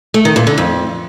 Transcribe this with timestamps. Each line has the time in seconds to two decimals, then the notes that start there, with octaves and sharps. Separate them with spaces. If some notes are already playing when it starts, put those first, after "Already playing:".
0.14 A3
0.25 D#3
0.36 A#2
0.47 D3
0.58 F2